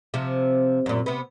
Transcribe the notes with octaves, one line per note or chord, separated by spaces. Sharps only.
C3 F3
F#2 A#2
C3 B3